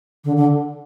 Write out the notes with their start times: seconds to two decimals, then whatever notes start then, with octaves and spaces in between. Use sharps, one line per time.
0.24 D3
0.36 D3